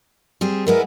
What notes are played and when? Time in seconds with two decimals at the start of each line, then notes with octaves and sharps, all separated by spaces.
0.41 G3 C4 G#4
0.67 G#3 B3 E4 A#4